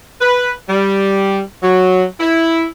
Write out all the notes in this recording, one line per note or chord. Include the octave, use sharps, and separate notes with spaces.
B4
G3
F#3
E4